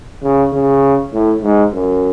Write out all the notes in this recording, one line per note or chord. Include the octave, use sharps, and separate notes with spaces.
C#3
C#3
A2
G#2
F#2